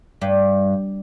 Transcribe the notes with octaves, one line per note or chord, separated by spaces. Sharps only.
G2